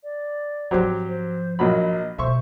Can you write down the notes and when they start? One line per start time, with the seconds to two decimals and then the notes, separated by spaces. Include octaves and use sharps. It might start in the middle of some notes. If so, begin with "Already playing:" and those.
0.04 D5
0.71 G#2 F3 F#3 C4 G4
1.08 C5
1.59 A#1 F#3 D#5 B5
2.18 B2 D3 C5 E5 C6 C#6